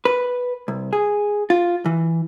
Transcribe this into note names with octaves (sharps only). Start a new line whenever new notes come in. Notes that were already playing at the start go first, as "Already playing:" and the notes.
B4
C2
G#4
F4
E3